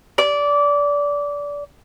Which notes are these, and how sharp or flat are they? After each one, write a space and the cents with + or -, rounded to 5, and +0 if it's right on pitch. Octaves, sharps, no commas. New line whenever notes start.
D5 -20